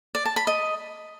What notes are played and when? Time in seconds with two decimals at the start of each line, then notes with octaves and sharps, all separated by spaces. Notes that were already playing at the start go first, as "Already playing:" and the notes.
0.15 D5
0.25 A5
0.36 B5
0.47 D#5